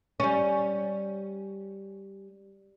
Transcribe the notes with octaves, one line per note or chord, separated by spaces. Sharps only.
G3 C#4